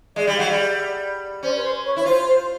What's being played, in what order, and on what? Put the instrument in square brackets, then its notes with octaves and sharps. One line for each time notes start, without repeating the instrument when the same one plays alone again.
[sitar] G#3 [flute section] D5 E5
[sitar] G3
[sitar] F#3 [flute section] D#5 F5
[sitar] G3
[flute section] D5 E5
[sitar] C#4 [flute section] C5 D5
[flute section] B4
C5
B4 C#5
[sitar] E4 [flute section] C#5
[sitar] F4 [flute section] C5
[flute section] C5